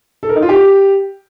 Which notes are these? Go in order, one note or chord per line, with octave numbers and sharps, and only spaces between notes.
A4
A#4
D#4
F4
G4